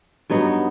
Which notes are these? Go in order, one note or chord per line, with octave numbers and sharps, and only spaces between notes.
G2 F#3 B3 D#4